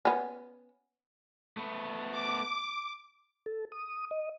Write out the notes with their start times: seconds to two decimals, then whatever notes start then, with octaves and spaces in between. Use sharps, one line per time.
0.05 B3 C#4
1.57 A3 B3
2.11 D6
3.46 A4
3.72 D#6
4.11 D#5